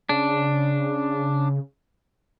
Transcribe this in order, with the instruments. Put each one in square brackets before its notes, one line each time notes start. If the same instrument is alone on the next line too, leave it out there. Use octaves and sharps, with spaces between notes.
[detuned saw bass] C#3 [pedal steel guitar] D4